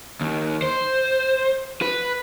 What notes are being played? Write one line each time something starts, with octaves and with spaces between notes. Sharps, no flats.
D#2
C5
B4